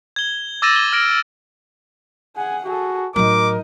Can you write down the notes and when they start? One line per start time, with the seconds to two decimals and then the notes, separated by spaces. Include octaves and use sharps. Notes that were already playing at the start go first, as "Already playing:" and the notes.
0.16 G#6 G7
0.62 D6 E6 A6 A#6 D#7 E7
0.76 G7
0.93 F6 A#6 D7
2.37 G#4 F#5 G#5
2.65 F#4 G#4 A4
3.16 A2 F#3 D#4 A#4 D#5 D6